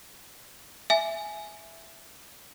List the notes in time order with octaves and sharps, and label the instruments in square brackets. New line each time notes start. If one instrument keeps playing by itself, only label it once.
[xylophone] E5 G#5